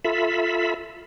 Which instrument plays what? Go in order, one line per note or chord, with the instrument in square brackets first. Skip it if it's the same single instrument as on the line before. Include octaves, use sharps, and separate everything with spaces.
[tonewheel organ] F4 A4 E5 B5